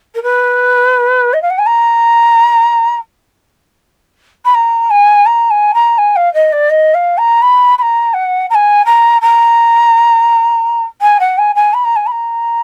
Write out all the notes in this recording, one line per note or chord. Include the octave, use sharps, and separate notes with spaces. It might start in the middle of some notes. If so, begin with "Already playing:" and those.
A#4
B4
D#5
F5
F#5
G#5
A#5
B5
A#5
G#5
A#5
G#5
A#5
G#5
F5
D#5
D5
D#5
F5
A#5
B5
B5
A#5
F#5
A#5
G#5
A#5
A#5
G#5
F#5
G#5
G#5
B5
A#5
G#5
B5
A#5